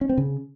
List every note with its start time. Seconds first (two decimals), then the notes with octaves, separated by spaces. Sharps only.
0.01 C#4
0.09 C4
0.18 C#3